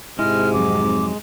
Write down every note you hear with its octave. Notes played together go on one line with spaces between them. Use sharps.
G#2 C3 G#3 E4 F6
F2 F#3 C4 D6